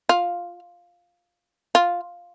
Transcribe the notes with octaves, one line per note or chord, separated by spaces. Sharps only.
F4
F4